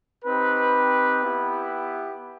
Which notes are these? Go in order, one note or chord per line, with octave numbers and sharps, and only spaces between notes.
C4 D#4 G4 B4
B3 E4 G4